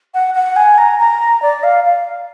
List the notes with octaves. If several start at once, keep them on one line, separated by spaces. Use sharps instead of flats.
F#5
F#5
G#5
A#5
A#5
D5
F5
F5